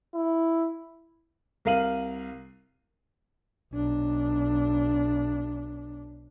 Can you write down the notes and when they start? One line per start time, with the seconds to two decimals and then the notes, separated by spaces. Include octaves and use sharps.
0.15 E4
1.65 C2 A#4 F5 D#7 F#7
3.73 B1 D4